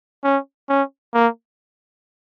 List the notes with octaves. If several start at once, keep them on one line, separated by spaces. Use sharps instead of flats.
C#4
C#4
A#3